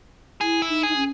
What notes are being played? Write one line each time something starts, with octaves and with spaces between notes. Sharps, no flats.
E4 G#4
E4
D#4
G#4
D#4
C#4